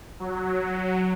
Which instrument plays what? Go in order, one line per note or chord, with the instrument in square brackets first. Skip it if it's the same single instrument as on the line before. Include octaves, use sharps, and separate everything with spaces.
[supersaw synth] F#3